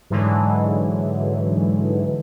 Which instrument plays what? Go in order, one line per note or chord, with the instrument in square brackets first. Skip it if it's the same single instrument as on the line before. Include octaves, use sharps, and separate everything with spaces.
[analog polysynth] G#2 D3 E3 F#3 G#3